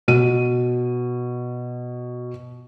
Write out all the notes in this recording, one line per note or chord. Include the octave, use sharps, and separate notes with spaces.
B2 D#7